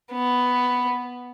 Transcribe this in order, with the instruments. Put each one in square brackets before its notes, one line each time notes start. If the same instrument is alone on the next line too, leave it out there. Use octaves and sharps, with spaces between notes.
[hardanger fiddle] B3